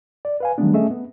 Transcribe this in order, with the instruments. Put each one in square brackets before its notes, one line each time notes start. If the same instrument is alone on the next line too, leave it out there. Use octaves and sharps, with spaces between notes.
[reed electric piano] D5
B4 F5 G#5
D#3 F#3 G3 A3 B3 D4
A3 C#4 G#4 A4 D#5 E5
B3